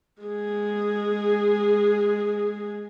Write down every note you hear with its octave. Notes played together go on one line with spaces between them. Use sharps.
G#3 G#4